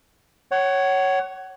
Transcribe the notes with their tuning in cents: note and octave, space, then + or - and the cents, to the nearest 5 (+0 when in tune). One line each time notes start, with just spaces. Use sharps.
C#5 +0 F#5 +30